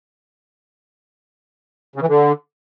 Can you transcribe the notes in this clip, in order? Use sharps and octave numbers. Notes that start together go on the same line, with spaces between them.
C#3
E3
D3